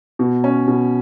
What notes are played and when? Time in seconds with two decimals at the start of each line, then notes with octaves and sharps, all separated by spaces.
0.19 B2
0.44 C#4
0.68 B2